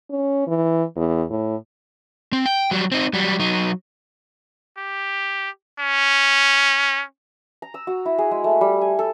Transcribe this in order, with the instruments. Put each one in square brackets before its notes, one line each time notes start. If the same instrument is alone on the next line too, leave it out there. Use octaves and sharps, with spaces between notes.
[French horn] C#4
E3
E2
A2
[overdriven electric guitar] C4
G5
F#3 G3
C4 D#4
F#3 G3
F#3 D#4
[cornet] G4
C#4
[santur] A#5
E6
F#4
E4
G#4
G#3
A3
G3
G#5
A4